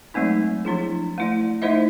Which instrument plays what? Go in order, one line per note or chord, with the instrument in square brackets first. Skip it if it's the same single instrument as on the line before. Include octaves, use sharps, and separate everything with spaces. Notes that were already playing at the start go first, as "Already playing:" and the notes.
[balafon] F#3 G#3 A3 C4 D#4
F3 D4 E4 G#4
A3 E4 D5
A3 D#4 E4 C5 D#5 E5